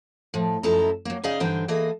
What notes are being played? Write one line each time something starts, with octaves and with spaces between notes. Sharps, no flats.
A2 F3
F#2 F3 E4 A4 D#5 A#5
F#3 A#3
C#3 D#4 G#4 D5 D#5 F5
G2 D3 E3 D#4 C5 G5
E3 A#3 G#4 A4 D#5